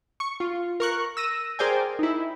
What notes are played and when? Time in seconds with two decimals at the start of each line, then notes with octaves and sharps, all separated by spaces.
0.20 C#6
0.40 F4
0.80 A#4 C#6 F#6
1.17 E6 A#6 D#7
1.59 G#4 A#4 C5 D5 G5 G#5
1.99 D#4 E4